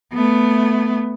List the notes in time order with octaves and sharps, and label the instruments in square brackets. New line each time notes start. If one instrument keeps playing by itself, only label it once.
[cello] A3 B3